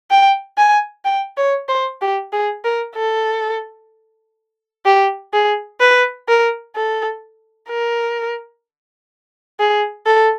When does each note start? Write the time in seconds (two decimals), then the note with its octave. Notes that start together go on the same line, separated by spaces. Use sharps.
0.11 G5
0.58 G#5
1.05 G5
1.37 C#5
1.68 C5
2.01 G4
2.32 G#4
2.64 A#4
2.96 A4
4.85 G4
5.33 G#4
5.81 B4
6.28 A#4
6.76 A4
7.69 A#4
9.60 G#4
10.06 A4